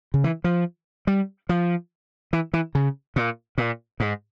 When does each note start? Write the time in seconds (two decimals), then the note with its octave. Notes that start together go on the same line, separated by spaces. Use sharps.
0.14 C#3
0.24 E3
0.44 F3
1.07 G3
1.49 F3
2.33 E3
2.54 E3
2.75 C#3
3.16 A#2
3.58 A#2
4.00 G#2